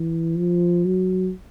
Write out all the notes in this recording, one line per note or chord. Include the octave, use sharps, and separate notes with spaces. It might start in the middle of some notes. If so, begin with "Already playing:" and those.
Already playing: E3
F3
F#3